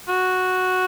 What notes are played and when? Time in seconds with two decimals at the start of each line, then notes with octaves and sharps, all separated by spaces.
0.09 F#4